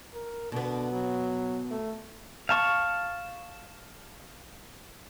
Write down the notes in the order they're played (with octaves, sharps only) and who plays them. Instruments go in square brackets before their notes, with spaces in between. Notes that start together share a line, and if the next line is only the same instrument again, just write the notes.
[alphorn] A#4
[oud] B2 B3 [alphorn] D3
[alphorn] F#3
A3
[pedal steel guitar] F5 A5 C#6